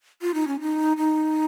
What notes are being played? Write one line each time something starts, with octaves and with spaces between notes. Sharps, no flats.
F4
D#4
C#4
D#4
D#4